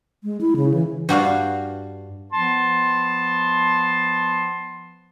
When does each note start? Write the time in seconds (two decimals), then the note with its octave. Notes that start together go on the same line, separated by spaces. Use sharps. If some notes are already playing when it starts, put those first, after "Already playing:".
0.24 G#3
0.41 E4
0.56 C#3
0.74 E3
1.09 G2 F#4 D5 F5
2.33 F3 B3 A5 C6